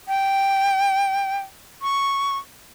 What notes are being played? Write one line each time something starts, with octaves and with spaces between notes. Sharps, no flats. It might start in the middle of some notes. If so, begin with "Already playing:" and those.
G5
C#6